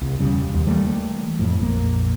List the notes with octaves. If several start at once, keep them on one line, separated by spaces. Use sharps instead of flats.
C2
E1 C#3 G3
D#2
E3 G3 A3 A#3
F2 A2
A#1 F2 A#3